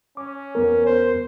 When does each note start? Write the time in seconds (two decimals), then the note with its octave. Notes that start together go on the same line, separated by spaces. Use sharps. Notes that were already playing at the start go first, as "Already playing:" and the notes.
0.17 C#4 D6
0.55 E2 B3 A#4
0.86 C5